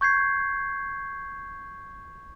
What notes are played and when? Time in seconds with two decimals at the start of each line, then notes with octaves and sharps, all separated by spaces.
0.01 C#6 G6 G#6 C7